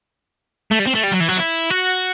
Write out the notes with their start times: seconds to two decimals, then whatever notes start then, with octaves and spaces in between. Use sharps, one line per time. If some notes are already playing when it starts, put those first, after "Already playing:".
0.71 A3
0.79 G3
0.87 C4
0.95 A3
1.03 G3
1.12 F#3
1.20 E3
1.29 F#3
1.37 E4
1.70 F#4